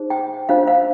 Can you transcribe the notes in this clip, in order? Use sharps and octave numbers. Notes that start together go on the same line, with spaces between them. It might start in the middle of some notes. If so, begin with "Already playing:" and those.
Already playing: D#4 G#4 C5
G5
D4 F4 C5 F5
F5